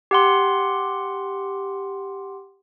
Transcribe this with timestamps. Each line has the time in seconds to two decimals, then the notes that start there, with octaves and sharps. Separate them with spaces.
0.11 G4 F#5 C6